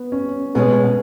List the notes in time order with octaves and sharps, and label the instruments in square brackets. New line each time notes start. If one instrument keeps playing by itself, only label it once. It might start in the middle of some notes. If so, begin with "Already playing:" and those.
Already playing: [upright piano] B3
C#4
[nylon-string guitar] B2 G#3 C#4 G#4 C#5 [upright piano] B3
[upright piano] B3